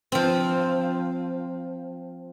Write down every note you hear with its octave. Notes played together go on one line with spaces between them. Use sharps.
F3 C4